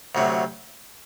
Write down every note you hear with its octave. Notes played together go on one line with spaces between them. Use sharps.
D2 C3 F#3